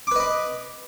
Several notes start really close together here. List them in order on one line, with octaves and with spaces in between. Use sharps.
D6 B4 D#5 B5